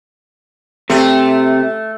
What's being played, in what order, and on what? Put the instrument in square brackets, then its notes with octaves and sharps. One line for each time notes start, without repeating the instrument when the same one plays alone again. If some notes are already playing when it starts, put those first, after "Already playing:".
[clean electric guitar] C3 [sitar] A3